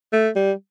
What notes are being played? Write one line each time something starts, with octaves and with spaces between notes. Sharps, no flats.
A3
G3